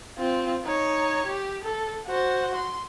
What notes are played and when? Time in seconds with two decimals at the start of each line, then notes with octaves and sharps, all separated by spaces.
0.18 C4 F4
0.65 D#4 C#5
1.26 G4
1.64 A4
2.06 F#4 C5
2.55 C6